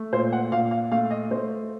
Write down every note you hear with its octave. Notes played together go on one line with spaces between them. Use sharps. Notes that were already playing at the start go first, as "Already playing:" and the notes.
Already playing: A3
A#2 C5
F#5
A#2 F5
F5
A3 F5
D#5
A3 C5